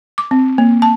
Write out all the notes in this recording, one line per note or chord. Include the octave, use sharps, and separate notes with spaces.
D6
C4
A#3
A5